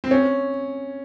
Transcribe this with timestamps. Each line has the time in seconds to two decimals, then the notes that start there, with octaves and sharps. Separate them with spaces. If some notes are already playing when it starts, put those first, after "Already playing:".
0.04 C4
0.11 C#4